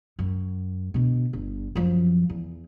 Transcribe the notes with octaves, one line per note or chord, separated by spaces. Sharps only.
F#2
B2 D3
G1
F#2 F3
E2